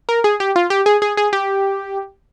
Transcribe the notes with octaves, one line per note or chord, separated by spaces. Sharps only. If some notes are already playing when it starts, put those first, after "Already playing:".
A#4
G#4
G4
F4
G4
G#4
G#4
G#4
G4